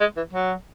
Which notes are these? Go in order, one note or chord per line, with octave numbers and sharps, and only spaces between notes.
G#3
E3
F#3